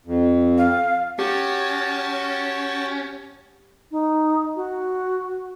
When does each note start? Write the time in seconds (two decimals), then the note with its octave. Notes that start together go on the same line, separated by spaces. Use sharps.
0.06 F2
0.58 F5
1.19 C#4 F#4 G4 G5 A5
3.91 D#4
4.56 F#4